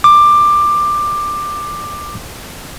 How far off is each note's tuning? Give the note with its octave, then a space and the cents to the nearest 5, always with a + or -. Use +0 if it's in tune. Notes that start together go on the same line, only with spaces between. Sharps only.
D6 +15